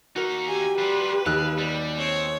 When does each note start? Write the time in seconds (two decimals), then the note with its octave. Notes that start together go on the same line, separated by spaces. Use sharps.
0.16 D#2 D#4 F#4 A#4
0.48 G4 G#5
0.78 G3 F4 B4
1.26 D#2 F5 E6 F#6
1.58 G3
1.98 C4 C#5